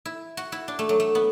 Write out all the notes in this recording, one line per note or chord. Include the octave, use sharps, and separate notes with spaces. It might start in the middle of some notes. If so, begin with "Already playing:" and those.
E4
F#4
E4
D4
A3
F#3
A3
B3